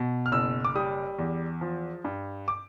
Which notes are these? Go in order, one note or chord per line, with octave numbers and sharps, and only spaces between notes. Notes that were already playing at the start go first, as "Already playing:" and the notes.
Already playing: B2
F6
F#1 E6
D6
G3 D#6
E2
F3
G2
D6